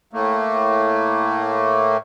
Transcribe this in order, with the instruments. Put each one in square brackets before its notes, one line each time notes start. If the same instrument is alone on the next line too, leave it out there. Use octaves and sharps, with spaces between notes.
[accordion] A2 A3 A#3